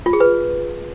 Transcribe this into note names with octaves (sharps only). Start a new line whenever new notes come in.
F4
G#4
B4